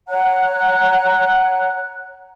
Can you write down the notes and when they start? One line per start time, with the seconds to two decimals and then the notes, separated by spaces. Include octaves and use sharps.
0.08 C#5 F#5 A#5 F#6